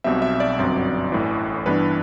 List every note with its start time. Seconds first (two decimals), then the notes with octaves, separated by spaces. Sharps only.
0.04 B1 B2 G3 C4 E5
0.22 E5
0.40 D5
0.59 G1 F#2 F#3 C4
1.12 A1 A2 E3
1.66 G2 E3 B3 D4 B4